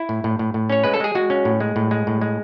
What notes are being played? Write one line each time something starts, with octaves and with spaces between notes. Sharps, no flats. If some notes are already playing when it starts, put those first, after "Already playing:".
Already playing: E4
A2
A2
A2
A2
C#4 C#5
G#3 B4
A4
G#3 G#4
G#3 F#4
C#4
A2
G#3
A2
G#3
A2
G#3